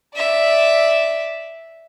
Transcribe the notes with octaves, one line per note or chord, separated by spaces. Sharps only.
D5 E5